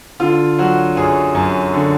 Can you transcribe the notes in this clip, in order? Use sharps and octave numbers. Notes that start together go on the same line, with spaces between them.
D3 F4
F#3 F#4
F#2 G#4
F#2
D3